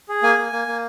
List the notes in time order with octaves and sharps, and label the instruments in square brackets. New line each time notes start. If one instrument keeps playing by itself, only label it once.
[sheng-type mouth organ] G#4
A#3 G#5
A#3
A#3
A#3